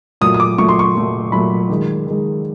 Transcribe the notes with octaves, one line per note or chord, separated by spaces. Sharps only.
A#2 F#3 A3 D#6
D#6
D6
A#2 F#3 A3 C#6
C6
C#6
A#2 F#3 A3
A#2 F#3 A3 B5
D#3 G#3
D#3 G#3